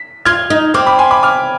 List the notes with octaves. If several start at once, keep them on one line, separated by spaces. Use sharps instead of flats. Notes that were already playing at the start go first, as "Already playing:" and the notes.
Already playing: B6
F4 F6 G#6
D#4
C4 D6 F6
B5 D6
G#5 C6
B5 D6
D6 F6